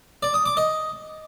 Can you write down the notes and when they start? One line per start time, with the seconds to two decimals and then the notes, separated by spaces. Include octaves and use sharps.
0.23 D5
0.34 D#6
0.46 D6
0.57 D#5